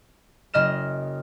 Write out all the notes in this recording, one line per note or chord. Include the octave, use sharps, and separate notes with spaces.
F#1 D#5 F6 E7